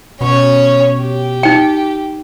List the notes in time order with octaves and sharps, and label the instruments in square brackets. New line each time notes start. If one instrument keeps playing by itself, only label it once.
[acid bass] B2 [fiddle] C#4 C#5
[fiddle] G4
[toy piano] D#4 G5